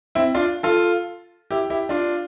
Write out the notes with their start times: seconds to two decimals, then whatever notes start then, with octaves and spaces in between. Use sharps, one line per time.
0.15 C4 E4
0.34 D4 F4
0.63 F4 A4
1.51 E4 G4
1.70 E4 G4
1.89 D4 F4